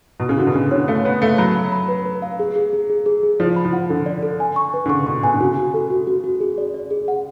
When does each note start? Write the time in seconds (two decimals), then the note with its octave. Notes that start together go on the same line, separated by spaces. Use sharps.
0.20 B2
0.29 C#3
0.37 D3 F#4
0.47 B2
0.54 C#3 D4
0.71 D3 C#5
0.88 A3 F5
1.05 B3 C#5
1.22 A3 F5
1.38 F#3 B5
1.56 B5
1.72 B5
1.89 B4
2.05 B4
2.22 F5
2.39 G#4
2.56 G#4
2.73 G#4
2.90 G#4
3.06 G#4
3.23 G#4
3.40 F3 D5
3.56 B5
3.65 F3
3.73 F#5
3.89 D3 A4
4.06 D5
4.23 A4
4.40 G#5
4.56 C#6
4.74 B4
4.86 D3
4.89 C#3 C#6
5.06 B2 C#6
5.23 B2 G#5
5.34 D3
5.40 C#3 F#4
5.58 F#4
5.74 A4
5.90 F#4
6.07 F#4
6.24 F#4
6.40 G#4
6.58 D5
6.74 D5
6.91 G#4
7.08 F#5